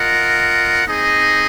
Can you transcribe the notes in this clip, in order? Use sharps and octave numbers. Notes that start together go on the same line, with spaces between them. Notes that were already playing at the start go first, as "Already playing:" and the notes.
Already playing: F4 A#4 D#5 F#5
C4 D#4 G#4 D#5